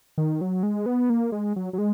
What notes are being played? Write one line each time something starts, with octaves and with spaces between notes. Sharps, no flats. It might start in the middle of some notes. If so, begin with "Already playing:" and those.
D#3
F#3
G#3
B3
A#3
G#3
F#3
F#3
G#3